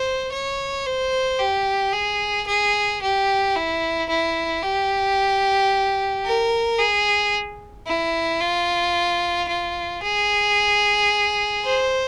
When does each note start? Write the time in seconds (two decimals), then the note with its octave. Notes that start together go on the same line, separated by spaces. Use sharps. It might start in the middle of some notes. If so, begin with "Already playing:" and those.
Already playing: C5
0.32 C#5
0.86 C5
1.39 G4
1.93 G#4
2.47 G#4
3.01 G4
3.56 E4
4.09 E4
4.63 G4
6.25 A#4
6.79 G#4
7.87 E4
8.41 F4
9.48 F4
10.03 G#4
11.65 C5